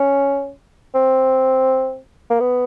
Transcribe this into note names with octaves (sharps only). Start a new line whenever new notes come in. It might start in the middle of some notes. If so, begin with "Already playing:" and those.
Already playing: C#4
C4
A#3
B3